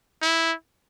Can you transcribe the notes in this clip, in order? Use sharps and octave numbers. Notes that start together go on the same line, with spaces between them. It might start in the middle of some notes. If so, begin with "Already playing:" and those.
E4